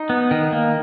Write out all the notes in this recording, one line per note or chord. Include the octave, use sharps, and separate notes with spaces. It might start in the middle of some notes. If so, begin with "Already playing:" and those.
Already playing: D#4
B3
D#3
A#3